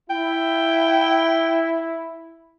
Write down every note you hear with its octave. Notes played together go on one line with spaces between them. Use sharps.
E4 G5